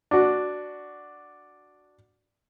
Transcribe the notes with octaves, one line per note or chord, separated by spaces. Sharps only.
D4 F#4